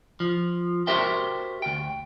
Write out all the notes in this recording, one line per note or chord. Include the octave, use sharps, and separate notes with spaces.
F3
F#4 G4 A#4 C5 E5 G5
D2 G5